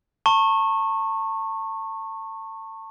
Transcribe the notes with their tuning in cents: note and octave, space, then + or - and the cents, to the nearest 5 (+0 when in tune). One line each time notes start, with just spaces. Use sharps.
A5 +30 C#6 -20